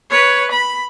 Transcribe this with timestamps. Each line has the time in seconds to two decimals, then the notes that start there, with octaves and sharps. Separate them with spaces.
0.11 B4 C#5
0.51 B5